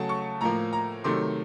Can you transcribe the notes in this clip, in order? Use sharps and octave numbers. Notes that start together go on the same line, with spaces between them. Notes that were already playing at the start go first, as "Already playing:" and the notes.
Already playing: C#3 F#3 A3 F#5 A5
C#6
A2 F3 A#3 A#5
A#5
C3 D#3 F#3 A3 C6